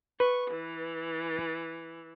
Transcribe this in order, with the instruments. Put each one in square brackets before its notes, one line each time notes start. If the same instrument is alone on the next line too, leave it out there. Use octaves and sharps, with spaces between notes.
[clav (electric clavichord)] B4 [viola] C#6
[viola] E3